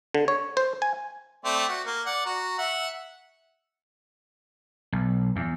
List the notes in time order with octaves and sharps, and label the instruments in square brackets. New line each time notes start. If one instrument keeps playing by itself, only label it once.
[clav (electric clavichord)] D3
C#5
C5
G#5
[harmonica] A3 C4 D5
F#4
A#3
D5 F#5
F#4 A#5
E5 F#5
[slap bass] B1
E2